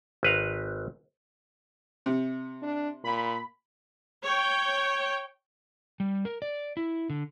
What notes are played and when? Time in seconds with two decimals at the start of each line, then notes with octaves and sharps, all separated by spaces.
0.23 G#1 B4 F5 A#5
2.06 C3
2.62 D4
3.04 A#2 B5
4.23 C#5 G5
6.00 G3
6.25 A#4
6.42 D5
6.77 E4
7.10 D3